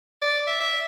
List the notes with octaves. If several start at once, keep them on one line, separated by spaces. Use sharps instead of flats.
D5
E5
E5